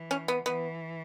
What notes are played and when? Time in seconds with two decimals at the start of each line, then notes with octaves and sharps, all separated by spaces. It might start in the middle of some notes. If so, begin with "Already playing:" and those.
Already playing: E3
0.11 C#4
0.28 B3
0.46 E3 B3